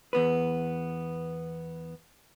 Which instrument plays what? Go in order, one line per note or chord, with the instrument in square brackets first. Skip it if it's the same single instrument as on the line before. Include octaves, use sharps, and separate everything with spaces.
[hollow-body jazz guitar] E2 B3 B4